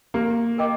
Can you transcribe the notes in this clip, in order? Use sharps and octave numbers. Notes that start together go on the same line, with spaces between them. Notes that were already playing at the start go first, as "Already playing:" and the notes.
A#3 G4
A#4 D#5 G5 D6